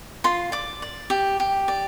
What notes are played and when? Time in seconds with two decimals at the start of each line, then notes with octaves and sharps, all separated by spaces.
0.24 F4 C6
0.52 D5 D6
0.82 D5
1.10 G4
1.40 G4
1.68 D5